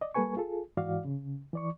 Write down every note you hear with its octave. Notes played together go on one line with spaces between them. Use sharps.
D5 D#5
G3 A#3 A4 B4 G#5 C#6
F4 G#4 A4
G#2 E3 F#4 D5 F5
C#3
E3 D5 C#6